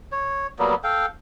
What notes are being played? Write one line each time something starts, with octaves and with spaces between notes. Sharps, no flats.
C#5
F#3 G3 A#3 B3
A4 F5 G5